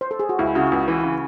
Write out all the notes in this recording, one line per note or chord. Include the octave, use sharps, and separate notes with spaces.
C5
A4
G#4
F#4
C#2 E4
C#3 F#4
C#2 F#4
E3
C#3